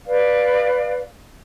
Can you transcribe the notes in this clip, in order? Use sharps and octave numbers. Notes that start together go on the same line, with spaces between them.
B4 D5 F5